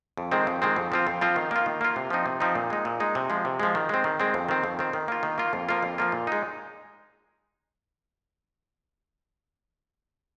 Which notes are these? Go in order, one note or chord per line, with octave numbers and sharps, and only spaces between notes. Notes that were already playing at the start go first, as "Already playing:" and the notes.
F2
D#3 G#3 C4
F2
D#3 G#3 C4
F2
F3 C4 F4
F2
F3 C4 F4
D#3
A#3 F4
D#3
A#3 F4
C3
F3 C4 D#4
C3
F3 C4 D#4
A#2
G#3 D#4
A#2
G#3 D#4
C3
F3 G#3
C3
F3 G#3
D#3
G#3 C4
D#3
G#3 C4
F2
D#3 C4
F2
D#3 C4
D#3
A#3 F4
D#3
A#3 F4
F2
F3 A#3 F4
F2
F3 A#3 F4
A#2
G#3 D#4